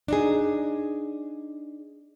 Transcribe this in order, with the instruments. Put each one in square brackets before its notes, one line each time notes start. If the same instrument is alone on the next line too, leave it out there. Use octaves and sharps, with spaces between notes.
[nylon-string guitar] D4 D#4 G#4